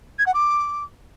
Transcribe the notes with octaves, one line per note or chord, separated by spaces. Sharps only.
G#6
F#5
D6